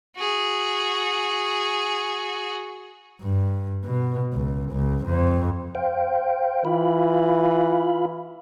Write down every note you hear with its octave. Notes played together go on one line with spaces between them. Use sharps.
F#4 G#4
G2
B2
C#2
C#2
F2
C5 F5 G5
E3 F4 F5 B5